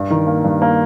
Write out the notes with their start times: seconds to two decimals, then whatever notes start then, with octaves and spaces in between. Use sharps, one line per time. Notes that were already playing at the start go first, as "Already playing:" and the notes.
Already playing: G2
0.10 D#3
0.27 A#3
0.44 G2
0.62 A#3